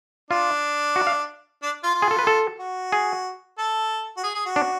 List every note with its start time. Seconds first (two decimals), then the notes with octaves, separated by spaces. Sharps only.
0.30 D4 F4
0.96 F#4
1.07 F5
1.62 D4
1.83 F4
1.94 F4
2.02 G#4
2.11 A4
2.19 B4
2.27 A4
2.59 F#4
2.92 G#4
3.58 A4
4.17 F#4
4.24 G#4
4.34 G#4
4.45 F#4
4.56 D4